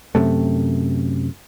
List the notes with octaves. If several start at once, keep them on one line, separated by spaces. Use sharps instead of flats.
F#2 C3 A3